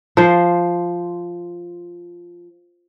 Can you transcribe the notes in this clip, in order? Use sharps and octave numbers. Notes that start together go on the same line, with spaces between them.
F3 C5